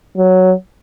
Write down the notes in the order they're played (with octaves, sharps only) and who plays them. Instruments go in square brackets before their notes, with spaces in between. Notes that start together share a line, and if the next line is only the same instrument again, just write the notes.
[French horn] F#3